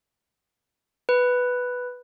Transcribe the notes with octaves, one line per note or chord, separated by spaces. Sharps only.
B4